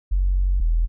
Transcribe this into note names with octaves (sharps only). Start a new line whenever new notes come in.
F#1
E1